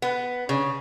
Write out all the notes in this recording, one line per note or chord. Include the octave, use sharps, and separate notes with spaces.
B3
C#3